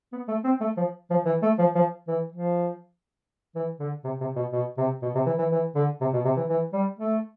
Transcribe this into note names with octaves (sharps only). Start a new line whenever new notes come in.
B3
A3
C4
A3
F3
F3
E3
A3
F3
F3
E3
F3
E3
D3
C3
C3
B2
B2
C3
B2
C3
E3
E3
E3
D3
C3
B2
C3
E3
E3
G3
A3